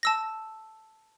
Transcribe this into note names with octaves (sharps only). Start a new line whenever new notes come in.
A5 E6 A#6